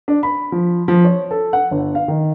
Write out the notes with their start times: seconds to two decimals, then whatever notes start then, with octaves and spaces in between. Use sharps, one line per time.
0.08 D4
0.23 B5
0.52 F3
0.88 F3
1.05 C#5
1.31 A4
1.53 F#5
1.71 G1
1.95 F5
2.08 D#3